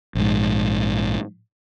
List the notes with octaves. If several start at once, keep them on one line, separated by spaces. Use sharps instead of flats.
A#1 G#2